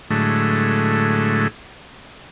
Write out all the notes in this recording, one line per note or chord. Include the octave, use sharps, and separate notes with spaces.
A2 D3 F#3 G#3 A3